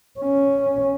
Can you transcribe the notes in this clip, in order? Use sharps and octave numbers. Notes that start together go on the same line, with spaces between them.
C#4